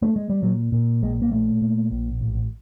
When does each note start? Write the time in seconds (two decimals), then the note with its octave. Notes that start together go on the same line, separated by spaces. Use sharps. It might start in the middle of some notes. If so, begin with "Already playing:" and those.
0.02 A3
0.16 G#3
0.30 G3
0.42 A#2 F#3
0.72 A#2
1.02 A#1 G#3
1.22 A#3
1.32 A#2 A3
1.61 A#2
1.91 A#1
2.21 A1